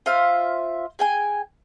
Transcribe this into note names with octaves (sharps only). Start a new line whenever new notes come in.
F4 C5 E5 F5
G#4 G5 G#5